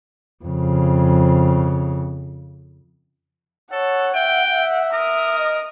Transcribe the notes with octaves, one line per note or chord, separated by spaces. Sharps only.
F2 C#3
A4 C#5 F#5
E5 G5
E5
A#4 D#6
D#5